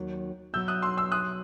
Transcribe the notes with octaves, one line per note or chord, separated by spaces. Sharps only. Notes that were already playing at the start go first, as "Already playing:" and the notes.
Already playing: D#2 D#3 F#3
B2 F#3 B3 E6 G6
D#6 F#6
C6 E6
C6 E6
D#6 F#6